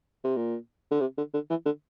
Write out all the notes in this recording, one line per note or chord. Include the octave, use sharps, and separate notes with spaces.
C3
A#2
D3
C3
D3
D3
E3
D3